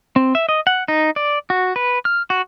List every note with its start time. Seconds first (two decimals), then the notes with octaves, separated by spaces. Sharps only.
0.16 C4
0.35 E5
0.49 D#5
0.67 F#5
0.88 D#4
1.16 D5
1.50 F#4
1.76 B4
2.05 F6
2.30 F#4